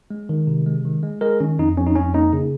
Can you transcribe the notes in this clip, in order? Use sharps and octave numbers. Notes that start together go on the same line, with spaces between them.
G#3
D#3
C3
G#3
D#3
G#3
G#3 A#4
D#3 C#4
F2 D#4
F2 C#4
D#4
F2 C#4
A#3 D#4
C#3